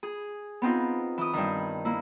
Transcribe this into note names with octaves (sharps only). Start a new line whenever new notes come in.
G#4
B3 C4 D#4 F4
E3 D#6
G2 D#3
A#3 E4